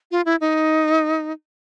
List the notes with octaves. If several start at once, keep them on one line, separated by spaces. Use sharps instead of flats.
F4
E4
D#4